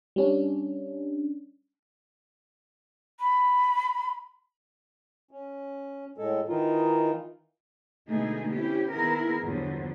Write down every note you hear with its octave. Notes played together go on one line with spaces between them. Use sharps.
G3 C#4 D4
B5
C#4
A2 G#3 A4
D#3 E3 D#4 F4
B2 D3 G#3 A3 D#4 G#4
C4 C#4 E4 G4
D#3 B3 E4 G#4 A#4
E2 G2 D3 F3 F#3